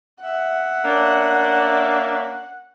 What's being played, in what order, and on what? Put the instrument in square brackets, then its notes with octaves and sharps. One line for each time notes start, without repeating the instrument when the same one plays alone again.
[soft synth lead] E5 [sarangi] F#5
[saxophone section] A#3 C#4 D4